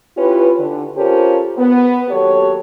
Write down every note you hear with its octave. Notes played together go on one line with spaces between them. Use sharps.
C#4 E4 F4 G4 B4
D3
C#4 F4 G4 A4 A#4 C5
B3
D#2 F#3 G4 A4 C#5